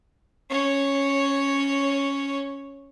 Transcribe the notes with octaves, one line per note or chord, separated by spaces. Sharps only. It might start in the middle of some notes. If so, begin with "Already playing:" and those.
C#4 C#5